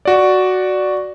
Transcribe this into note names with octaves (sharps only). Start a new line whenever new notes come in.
F#4 D5